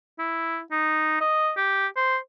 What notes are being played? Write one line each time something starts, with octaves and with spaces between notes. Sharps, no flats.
E4
D#4
D#5
G4
C5